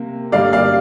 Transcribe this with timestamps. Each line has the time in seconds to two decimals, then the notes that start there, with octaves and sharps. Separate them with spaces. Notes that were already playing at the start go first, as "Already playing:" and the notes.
Already playing: C3 A#3
0.32 G2 D3 G3 A#3 D5 F5
0.53 D5 F5